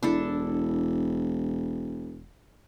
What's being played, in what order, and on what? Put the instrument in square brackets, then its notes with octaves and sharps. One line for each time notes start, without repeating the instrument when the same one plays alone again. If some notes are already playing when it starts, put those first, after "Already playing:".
[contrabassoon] E1 [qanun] D4 E4 A4